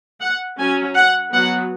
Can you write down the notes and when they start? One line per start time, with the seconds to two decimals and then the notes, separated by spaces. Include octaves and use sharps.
0.20 F#5
0.58 F#3 C#4 G#5
0.95 F#5
1.33 F#3 B3 F#5